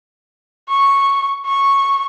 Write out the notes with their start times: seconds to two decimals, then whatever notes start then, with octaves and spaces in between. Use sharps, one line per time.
0.69 C#6
1.46 C#6